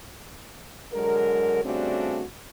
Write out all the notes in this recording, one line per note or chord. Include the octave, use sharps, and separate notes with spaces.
D3 F#3 G#3 A#4
C#3 G3 A3 C4 D4 F#4